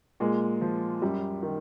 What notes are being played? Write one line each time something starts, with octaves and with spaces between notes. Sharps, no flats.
A#2 G#3
F3
F#2 G3
D#3